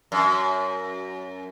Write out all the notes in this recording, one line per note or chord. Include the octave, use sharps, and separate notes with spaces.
F#2